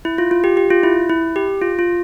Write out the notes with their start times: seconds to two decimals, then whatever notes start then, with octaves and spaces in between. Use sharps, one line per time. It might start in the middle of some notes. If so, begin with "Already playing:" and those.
0.05 E4
0.18 F4
0.31 F4
0.44 G4
0.57 G4
0.70 F4
0.83 E4
1.09 E4
1.36 G4
1.62 F4
1.79 F4